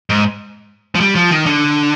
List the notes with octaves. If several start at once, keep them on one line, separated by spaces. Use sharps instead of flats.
G#2
F3
G3
F3
D#3
D3